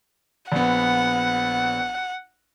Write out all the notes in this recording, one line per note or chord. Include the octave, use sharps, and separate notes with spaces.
A#1 B3 F#5